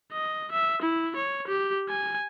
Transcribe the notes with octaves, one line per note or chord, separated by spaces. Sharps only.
D#5
E5
E4
C#5
G4
G#5